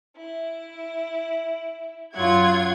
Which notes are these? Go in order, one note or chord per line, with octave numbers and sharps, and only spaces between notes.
E4
F#2 F#3 F4 F#5 G#6